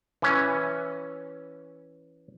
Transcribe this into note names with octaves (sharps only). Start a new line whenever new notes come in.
E3 C#4